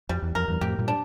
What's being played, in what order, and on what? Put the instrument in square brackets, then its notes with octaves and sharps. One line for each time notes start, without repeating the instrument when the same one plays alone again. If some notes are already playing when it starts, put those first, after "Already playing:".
[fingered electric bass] F2 [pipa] G3
[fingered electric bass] E2
[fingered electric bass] F2 [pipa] A#4
[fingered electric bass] E2 G2
[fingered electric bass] F2 A2 [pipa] G4
[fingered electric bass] G2 A#2
[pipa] D4